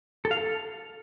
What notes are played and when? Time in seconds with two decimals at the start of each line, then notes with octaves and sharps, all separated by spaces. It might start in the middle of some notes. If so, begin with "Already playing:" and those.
0.25 A4
0.31 F5
0.37 A4